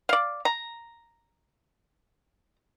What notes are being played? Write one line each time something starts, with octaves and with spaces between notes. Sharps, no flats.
D5 F5
A#5